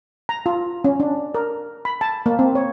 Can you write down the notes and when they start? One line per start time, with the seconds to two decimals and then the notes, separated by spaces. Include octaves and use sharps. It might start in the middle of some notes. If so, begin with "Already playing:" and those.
0.29 A#5
0.46 F4
0.84 C#4
1.00 D4
1.35 A#4
1.85 B5
2.01 A5
2.26 A#3
2.39 C4
2.55 C#5